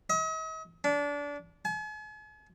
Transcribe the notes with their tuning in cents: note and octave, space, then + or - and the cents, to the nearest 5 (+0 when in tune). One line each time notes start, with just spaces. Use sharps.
D#5 +45
D4 -25
G#5 +45